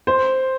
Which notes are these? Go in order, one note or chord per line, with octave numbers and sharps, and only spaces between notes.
C5